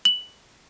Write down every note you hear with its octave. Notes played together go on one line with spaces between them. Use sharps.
F#7